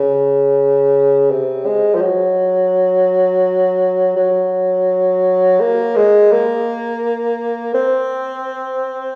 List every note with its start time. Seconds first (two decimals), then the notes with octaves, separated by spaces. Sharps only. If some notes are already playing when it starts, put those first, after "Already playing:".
Already playing: C#3
1.30 C3
1.66 G#3
1.95 F3
2.01 F#3
4.16 F#3
5.60 A#3
5.96 G#3
6.32 A#3
7.74 C4